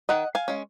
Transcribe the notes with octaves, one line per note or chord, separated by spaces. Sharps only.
D#3 D#5 F#5
F5 G#5
G#3 C#4